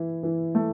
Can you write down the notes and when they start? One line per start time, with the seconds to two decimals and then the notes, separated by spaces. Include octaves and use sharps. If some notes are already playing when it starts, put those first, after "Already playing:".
Already playing: E3 E4
0.23 E3
0.55 A3